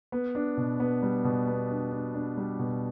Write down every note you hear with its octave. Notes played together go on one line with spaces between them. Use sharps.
B3
D4
B2
B3
G3
B2
B3
D4
D4
D4
G3
B2